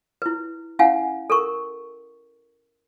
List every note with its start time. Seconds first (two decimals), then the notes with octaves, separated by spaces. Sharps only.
0.22 E4 B4
0.79 C#4 E4 F5 F#5 G#5
1.30 A4 A#4 C#6